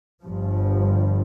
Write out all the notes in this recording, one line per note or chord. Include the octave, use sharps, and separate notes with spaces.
G1 G2 F3